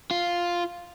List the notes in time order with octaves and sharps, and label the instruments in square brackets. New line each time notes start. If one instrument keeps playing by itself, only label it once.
[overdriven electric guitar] F4